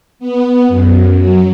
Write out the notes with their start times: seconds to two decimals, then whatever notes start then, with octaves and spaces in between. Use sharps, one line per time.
0.19 B3
0.68 F#2
1.16 F#3